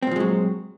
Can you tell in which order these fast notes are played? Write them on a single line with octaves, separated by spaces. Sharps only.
C4 A#2 F3 G#3 F#3